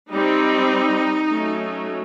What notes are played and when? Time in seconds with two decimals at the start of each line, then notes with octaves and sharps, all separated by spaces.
0.11 G3 C4 D#4
1.28 F#3 A3 C#4